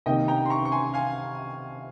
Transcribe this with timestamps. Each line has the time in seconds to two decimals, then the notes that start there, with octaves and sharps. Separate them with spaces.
0.06 C3 D#3 A#3 D#5 G5
0.28 G5 A#5
0.46 C6
0.50 A#5 C#6
0.65 C#6
0.72 G#5 C6
0.94 F5 G#5